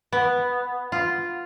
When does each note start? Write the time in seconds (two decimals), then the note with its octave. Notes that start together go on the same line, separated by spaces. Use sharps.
0.12 B3
0.92 F4